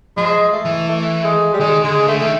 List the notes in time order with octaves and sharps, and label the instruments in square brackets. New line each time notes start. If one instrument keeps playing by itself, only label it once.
[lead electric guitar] F3 [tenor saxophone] G#3
[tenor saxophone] A3
[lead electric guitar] E3
[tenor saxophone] A3
G#3
G3
[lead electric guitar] D#3 [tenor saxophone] G#3
[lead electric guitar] D3 [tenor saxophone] G#3
[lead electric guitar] C#3
[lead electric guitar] D3 [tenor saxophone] A3
[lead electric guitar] D#3